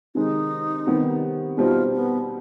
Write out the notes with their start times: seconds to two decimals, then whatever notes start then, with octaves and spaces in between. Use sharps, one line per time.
0.15 C3 D#3 G#3 D#4
0.87 C3 D#3 G3 B3
1.57 B2 G3 C4 D#4 F4
1.93 B3